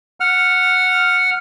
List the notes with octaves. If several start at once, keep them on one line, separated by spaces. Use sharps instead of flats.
F#5 F6